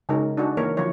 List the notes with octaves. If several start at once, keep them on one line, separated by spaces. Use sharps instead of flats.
C#3 G#3 C#4 D#4 F#4 A#4
D4 D#4 F#4 G#4
E3 A#3 A#4 C#5
D3 F3 F#3 E4 C#5